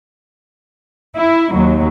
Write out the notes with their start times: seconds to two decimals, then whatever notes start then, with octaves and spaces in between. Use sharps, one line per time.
1.16 E4
1.53 D#2 F#3